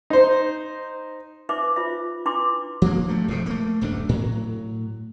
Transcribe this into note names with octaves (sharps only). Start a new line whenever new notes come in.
D#4 C5
D#4 B4 C5 E5 D6
F4 C5 E5
D4 E4 B4 C6 D6
F3 A#3 D4
G2 A3
E1 A2 C3 F3
A3 A#3
D#1 F#2 A3 D4
A2 F#3